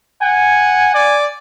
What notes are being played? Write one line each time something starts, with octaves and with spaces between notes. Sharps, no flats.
F#5 G#5
D5